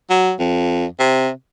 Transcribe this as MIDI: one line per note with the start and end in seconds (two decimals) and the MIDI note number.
0.10 0.32 54
0.39 0.85 41
0.99 1.30 48